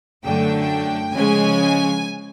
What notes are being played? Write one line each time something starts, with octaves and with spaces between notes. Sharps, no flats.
F#2 D3 F#3 A3 D4 G5
C#3 F3 G#3 C#4 G#5